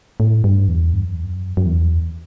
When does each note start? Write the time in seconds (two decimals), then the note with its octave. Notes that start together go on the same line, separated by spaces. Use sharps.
0.20 A2
0.44 G2
0.68 E2
0.93 G2
1.03 F#2
1.14 E2
1.24 F#2
1.57 F#2
1.66 E2